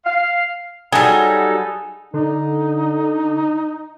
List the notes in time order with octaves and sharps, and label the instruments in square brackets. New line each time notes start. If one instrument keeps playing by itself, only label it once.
[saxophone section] F5
[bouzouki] F#3 G3 [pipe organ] D#4 A4 [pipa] G#4
[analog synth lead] D3 [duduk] D#4